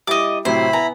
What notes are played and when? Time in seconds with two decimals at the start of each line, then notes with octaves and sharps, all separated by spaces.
0.07 G3 E4 D#5 D6
0.45 A2 C3 F#3 E4 C5 B5
0.73 B3 G#5 A#5